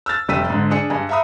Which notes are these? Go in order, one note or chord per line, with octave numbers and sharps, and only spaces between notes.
E6 F6 A6
F1 G3 E6 B6 D#7
G#2 D3
D4 G#4 C#7
G2 G#5
E5 F5 A#5 B5 D#6